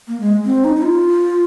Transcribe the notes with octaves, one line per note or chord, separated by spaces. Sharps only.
A#3
G#3
C4
D#4
D#4
F4